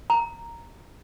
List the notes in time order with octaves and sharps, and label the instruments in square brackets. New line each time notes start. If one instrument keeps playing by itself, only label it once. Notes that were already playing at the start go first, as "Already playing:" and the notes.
[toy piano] A#5